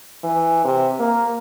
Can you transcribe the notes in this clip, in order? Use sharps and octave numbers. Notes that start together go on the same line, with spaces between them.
E3
C3
A#3